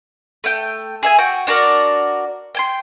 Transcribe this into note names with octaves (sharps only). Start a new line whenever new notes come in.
A3 G5
G#4 E5 G#5
F#4 G5
D4 F#4 A#4 D5
G5 G#5 C6